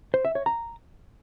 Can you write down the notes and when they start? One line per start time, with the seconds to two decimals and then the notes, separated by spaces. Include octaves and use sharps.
0.14 C5
0.25 E5
0.35 C#5
0.46 A#5